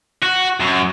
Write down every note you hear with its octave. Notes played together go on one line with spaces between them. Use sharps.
F#4
F#2